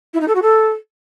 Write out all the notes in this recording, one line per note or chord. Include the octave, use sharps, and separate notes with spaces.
E4
D#4
A4
F#4
A4